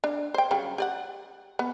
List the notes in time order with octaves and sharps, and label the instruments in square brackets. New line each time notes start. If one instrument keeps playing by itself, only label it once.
[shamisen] D4
C5 G5
C#3 F#3 G3
G4 D5 F#5
B3